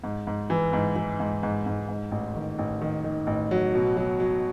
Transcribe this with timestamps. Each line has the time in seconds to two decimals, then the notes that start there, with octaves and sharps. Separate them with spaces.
0.04 G#2
0.27 G#2
0.50 E3
0.73 G#2
0.96 E3
1.20 G#2
1.43 G#2
1.66 G#2
1.89 G#2
2.11 A1
2.36 D#3
2.59 A1
2.81 D#3
3.04 D#3
3.27 A1
3.51 F#3
3.74 B2
3.97 F#3
4.20 F#3